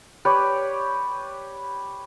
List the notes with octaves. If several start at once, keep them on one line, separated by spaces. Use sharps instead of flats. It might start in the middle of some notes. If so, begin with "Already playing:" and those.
G4 B4 C#5 D5